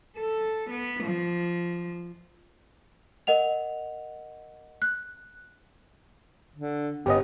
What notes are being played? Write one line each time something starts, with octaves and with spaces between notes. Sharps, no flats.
A4
B3
F3
A#4 D#5 F#5 F7
F#6
D3
G1 B3 C#4 G4 D#5